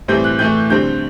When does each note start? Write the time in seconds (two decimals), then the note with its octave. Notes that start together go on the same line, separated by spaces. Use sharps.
0.08 A2 E3 G3 C4 G6
0.24 F#6
0.39 A2 E3 A3 G6
0.70 D3 G3 C4 G6